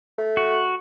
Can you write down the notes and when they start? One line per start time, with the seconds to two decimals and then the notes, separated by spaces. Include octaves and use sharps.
0.18 A3
0.37 F#4